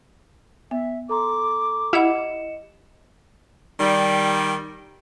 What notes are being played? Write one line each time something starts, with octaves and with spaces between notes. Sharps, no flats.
B3 E5
A4 A#5 C6 D6
E4 G4 D#5 F#5 C#7 E7
D#3 G3